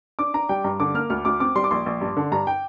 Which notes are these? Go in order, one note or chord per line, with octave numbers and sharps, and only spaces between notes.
D4 D6
D4 A#5
G3 G5
G2 A#5
D3 D6
A#3 F6
D2 F6
D2 D6
C4 D6
G3 C6
D6
A#1 C6
A#1
G2
D3
G2 A#5
G5